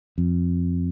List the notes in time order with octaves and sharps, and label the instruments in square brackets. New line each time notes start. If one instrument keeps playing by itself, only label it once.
[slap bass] F2